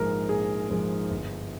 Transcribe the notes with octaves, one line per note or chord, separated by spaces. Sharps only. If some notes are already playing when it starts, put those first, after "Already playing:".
Already playing: A#1 G#2 F3 G#3 A#4
A#1 G#4
G#2 F3 G#3
G1